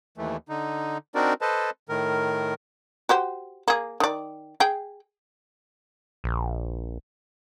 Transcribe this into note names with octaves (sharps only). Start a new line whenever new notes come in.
D#2 E3 A3
D3 D#4
C4 D4 D#4 F#4 A#4 D5
A4 B4 C5 D#5 A5
A2 D#3 A#4
F#4 G4 C5
A#3 G#4
D#3 D5
G#4 G5
A#1